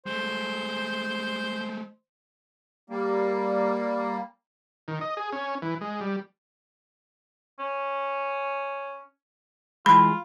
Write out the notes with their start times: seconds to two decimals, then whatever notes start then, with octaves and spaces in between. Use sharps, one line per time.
0.06 G#3 A3 C5
2.90 G3 A#3
4.88 D#3
5.01 D#5
5.17 G#4
5.33 C#4
5.62 E3
5.81 G#3
6.01 G3
7.59 C#4
9.86 E3 G#3 F4 B5